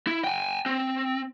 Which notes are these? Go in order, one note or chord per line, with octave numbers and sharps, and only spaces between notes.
E4
G5 G#5
C4